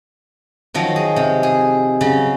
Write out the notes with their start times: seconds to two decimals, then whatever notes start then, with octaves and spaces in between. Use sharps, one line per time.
0.74 D#3 F3 F#3
0.96 G#4
1.16 C3
1.43 G#4
2.01 C#3 F#3